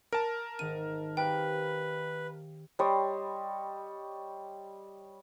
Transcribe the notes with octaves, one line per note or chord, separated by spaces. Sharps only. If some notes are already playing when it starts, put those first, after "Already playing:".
A#4 A5 D7
G#1 D#3 F#5 D#7
C4 G4 B4 F5 G5
G3 C#5 D#5 C6